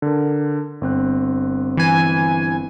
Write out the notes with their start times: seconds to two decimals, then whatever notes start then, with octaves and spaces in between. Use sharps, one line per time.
0.02 D3 A#4
0.81 G1 C4 F#6
1.77 E3 G#5